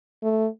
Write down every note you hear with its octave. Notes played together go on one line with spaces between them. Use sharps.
A3